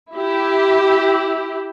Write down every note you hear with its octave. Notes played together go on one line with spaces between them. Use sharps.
E4 G4